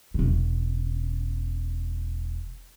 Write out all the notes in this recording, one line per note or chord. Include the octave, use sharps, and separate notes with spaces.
E1 C#4